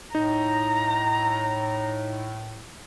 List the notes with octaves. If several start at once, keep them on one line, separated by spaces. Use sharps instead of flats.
A2 D#4 A#5